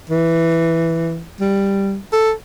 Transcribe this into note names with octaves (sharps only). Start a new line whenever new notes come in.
E3
G3
A4